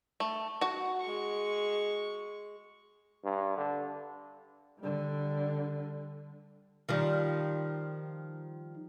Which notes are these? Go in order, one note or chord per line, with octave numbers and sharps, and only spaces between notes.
A3
F#4 F#5
G#3 C#6
G2
D3
D3 G3
D#3 F3 G3